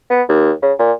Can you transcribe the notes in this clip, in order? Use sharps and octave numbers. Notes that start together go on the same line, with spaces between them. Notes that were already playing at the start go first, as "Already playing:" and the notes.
B3
D#2
C#3
A#2